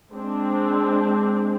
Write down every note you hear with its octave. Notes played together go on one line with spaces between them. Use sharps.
G#3 C4 D4